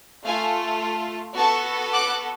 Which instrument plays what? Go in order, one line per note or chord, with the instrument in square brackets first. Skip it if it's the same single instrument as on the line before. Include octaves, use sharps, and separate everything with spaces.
[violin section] A3 F4 A4 F5 G#5
B3 F#4 A4 A5 C#6
D6 F#6